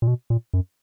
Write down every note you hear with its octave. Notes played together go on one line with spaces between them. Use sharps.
A#2
B2
A#2
F#2